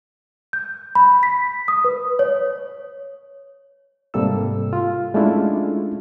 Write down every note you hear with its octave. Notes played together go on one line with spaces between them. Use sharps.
G6
B5
B6
D#6
B4
C#5
G#2 C3 G3 A#3 A4 E6
F4
G#3 A3 C#4 D4 E4 F4